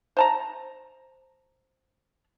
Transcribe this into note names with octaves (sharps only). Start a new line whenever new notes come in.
C5 A5 A#5